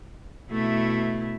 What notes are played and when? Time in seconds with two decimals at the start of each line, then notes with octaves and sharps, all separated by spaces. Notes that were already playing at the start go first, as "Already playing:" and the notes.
0.50 B2 A3 E4